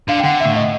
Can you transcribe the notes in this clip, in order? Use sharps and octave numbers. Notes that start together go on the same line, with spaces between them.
D3 F5
G5
D3 F#5
E5
A2
D#5